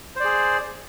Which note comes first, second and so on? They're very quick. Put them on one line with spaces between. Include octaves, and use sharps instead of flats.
C5 D5 G#4